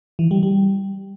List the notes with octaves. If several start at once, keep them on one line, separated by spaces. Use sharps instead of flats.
E3
G3
G3